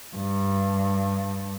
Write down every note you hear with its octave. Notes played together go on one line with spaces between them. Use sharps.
G2